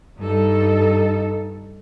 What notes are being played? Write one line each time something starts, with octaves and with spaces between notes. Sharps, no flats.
G2 D#4 A4